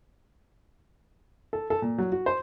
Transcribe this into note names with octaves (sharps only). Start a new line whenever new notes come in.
A4
A4
A#2
F#3
F#4
C5